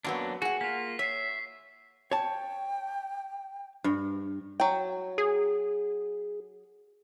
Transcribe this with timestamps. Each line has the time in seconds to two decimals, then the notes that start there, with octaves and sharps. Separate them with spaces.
0.05 F#2 F#3 A#3 B3 D4
0.42 F#4 G#4 F#5
0.61 A#3 F4 B6
0.99 C#5 E5 B6 C7
2.12 C#5 G5 A5
3.84 G2
4.60 F#3 G5
5.18 G#4